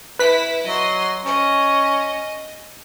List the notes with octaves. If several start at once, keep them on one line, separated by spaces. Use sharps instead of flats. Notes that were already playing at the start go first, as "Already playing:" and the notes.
E4 B4 B6
F#3 D#5 C6
C#4 D#5